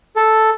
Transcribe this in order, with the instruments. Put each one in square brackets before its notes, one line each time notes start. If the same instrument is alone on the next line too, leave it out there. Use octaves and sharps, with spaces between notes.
[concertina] A4